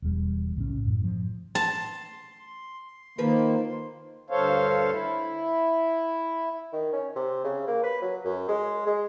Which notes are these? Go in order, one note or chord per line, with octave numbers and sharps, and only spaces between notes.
E1 E2 G3
B1 A2 C#3 C#4
F#2 A2
F3
A5 C6
D#3 F3 A#3 B4
D2 G2 A4 C5 C#5 F5
E4
D#3
C#4
C3
C#3
A#3
B4
F#3
F#2
G#3
G#3